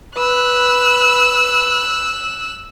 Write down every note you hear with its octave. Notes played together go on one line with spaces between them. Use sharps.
B4 E6 F#6